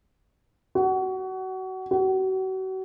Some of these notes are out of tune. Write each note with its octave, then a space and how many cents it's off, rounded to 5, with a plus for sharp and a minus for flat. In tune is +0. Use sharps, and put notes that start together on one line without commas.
F#4 +25
F#4 +35